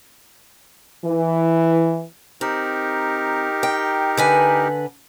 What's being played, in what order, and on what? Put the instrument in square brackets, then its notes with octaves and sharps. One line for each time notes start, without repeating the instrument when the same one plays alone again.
[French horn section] E3
[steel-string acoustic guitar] C4 [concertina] D#4 G4 A#4
[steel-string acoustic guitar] G5
D3 B4 G#5